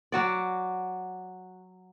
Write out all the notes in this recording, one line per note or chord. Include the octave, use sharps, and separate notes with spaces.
F#3 F#4 D5